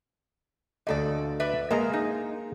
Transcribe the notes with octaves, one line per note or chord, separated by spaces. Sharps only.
D2 A#2 A4 D5 D#5
B4 D5 E5
G#3 A#3 G#4 A#4
D#4